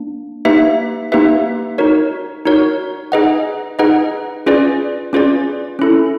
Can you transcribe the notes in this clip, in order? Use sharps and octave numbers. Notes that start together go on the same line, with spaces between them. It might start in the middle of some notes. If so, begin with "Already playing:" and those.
Already playing: A#3 D4
A#3 D#4 G4 B4 E5
A#3 D#4 G4 B4 E5
D#4 F#4 A#4 C#5
D#4 F#4 A#4 C#5
D#4 G#4 B4 D#5 F#5
D#4 G#4 B4 D#5 F#5
C#4 F4 G#4 B4 D5
C#4 F4 G#4 B4 D5
C#4 E4 A4